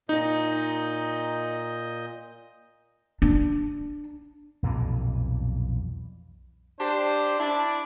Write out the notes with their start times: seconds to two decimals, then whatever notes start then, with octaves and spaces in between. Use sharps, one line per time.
0.09 A#2 D#4 D#5 G6
3.22 D4
4.63 B1 F2 A#2 E3
6.80 D4 G4 C5
7.38 D4 E4 D5